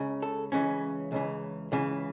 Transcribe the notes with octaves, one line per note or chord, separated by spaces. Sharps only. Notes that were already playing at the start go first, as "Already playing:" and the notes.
Already playing: C#2 C#3
A4
C#2 C#3 E3 C#4
C#2 C#3 E3
C#2 C#3 E3